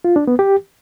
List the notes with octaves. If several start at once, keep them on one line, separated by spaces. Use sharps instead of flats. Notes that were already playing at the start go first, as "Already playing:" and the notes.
F4
D4
B3
G4